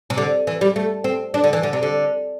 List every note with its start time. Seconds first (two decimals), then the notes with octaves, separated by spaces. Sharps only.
0.10 C3
0.18 D3
0.47 E3
0.61 G3
0.76 A3
1.04 C4
1.34 D4
1.44 D3
1.53 E3
1.63 D3
1.73 C3
1.83 D3